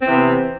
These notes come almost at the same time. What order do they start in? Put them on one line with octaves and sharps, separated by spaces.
C4 E3 C3 B3